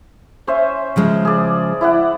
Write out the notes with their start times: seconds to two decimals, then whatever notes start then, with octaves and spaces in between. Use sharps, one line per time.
0.47 C#4 C5 E5
0.96 C#3 F3 G#3
1.25 G#4 D5
1.81 E4 D5 F#5